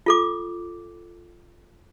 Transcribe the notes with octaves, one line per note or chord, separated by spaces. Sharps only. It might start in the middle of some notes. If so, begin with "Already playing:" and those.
F4 A4 D6